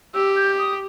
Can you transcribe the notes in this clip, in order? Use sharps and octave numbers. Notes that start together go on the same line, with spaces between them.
G4 E6
G6
D#6